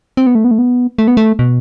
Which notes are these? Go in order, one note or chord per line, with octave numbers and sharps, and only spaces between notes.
C4
B3
A3
B3
A3
B3
A3
B3
A3
B2